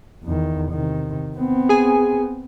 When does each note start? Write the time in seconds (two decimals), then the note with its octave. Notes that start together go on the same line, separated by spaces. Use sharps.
0.24 E2 D#3
0.71 C3 D#3
1.37 B3 C4
1.69 G#4 G#5